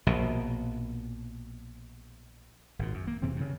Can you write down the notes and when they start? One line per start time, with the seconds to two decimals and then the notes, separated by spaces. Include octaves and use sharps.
0.07 A#1 B2
2.79 G#1 A#2
2.94 F#2
3.07 A#3
3.22 E2 C3 E3 C4
3.36 G2 C#3